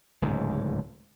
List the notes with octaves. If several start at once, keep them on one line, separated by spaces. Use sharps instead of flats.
D1 C#2 G#2